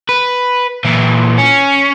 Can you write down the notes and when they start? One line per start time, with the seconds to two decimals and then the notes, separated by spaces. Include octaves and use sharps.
0.09 B4
0.85 A#2 E3
1.38 C#4